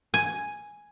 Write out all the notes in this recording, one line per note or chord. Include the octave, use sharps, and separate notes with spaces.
G#5